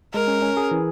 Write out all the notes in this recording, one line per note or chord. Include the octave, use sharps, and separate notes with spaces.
G#3 A#4
C#4
C#4
G#4
E3